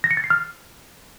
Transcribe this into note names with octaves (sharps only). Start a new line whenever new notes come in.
A#6
C#7
A6
C7
F6